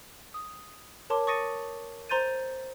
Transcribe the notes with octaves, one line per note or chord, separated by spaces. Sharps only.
D#6
A#4 C#5 A5 C6 D6
C#6 D#6 A6 A#6 C#7 D#7
C5 A#5 C6 G6 A6 D#7